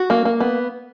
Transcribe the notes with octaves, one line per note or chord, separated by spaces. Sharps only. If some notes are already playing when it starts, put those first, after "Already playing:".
Already playing: F#4
A#3
A#3
B3